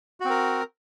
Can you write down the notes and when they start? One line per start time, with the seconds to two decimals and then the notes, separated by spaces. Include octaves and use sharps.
0.20 F#4
0.25 C4
0.30 A#4